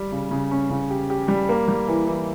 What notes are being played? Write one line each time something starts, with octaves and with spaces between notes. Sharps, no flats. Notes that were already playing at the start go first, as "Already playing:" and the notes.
Already playing: G3
C#3
C#3
C#4
C#3
G4
G4
G3
A#3
G3
E3
E3